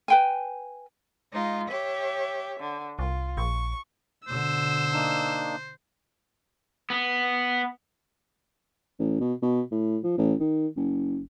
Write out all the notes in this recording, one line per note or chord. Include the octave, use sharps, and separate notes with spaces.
B4 G5 G#5
G#3 D#4 F4
G4 C#5 E5
D3
C2 F4
A#1 C#6
B2 D3 C5 E6
A#3 D4 D#4
B3
A1
B2
B2
A2
F3
A1
D#3
F#1